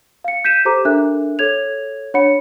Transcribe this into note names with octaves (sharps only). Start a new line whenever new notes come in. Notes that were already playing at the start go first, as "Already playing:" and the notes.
F5 C#7
G6 B6 D#7 E7
G4 A4 C5 A#5 D6
D4 A4 A#4 E5 F#6
A4 C#5 G#6 F7
D4 C#5 F#5 B5 C#7